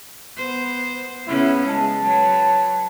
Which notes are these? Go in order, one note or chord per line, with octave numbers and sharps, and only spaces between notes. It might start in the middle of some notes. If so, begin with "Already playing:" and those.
B3 C5
C#3 B3 C#4 E4
G#3 A5
F#3 B4 C#5